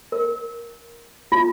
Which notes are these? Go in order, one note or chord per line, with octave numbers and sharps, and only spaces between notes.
A#4
F4